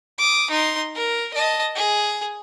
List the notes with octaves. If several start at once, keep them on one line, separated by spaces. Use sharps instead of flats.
D6 D#6
D#4 C6
A#4
D#5 A5
G#4